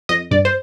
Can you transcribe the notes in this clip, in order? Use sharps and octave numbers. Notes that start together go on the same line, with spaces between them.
F2 D#5
G2 D5
C5